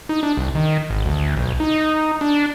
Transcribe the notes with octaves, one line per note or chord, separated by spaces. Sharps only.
D#4
D4
C2
D#3
G#1
D2
B1
D#4
D4